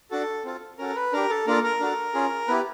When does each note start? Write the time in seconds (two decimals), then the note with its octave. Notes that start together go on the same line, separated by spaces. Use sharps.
0.11 D4 F#4 A4
0.44 C4 F4 A4
0.78 C#4 F#4 A4 A#4
0.95 B4
1.13 D4 G4 A#4
1.30 A4
1.47 A#3 D4 F4 A4 A#4
1.64 A#4
1.80 D4 F#4 A4
2.14 C#4 F4 G#4
2.48 B3 E4 G4 B4